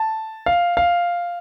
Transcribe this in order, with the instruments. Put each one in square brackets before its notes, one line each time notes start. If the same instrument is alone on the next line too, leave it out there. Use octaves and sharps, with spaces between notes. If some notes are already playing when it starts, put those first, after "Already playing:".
Already playing: [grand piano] A5
F5
F5